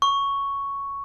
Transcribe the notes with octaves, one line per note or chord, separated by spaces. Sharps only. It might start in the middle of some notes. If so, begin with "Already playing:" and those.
C#6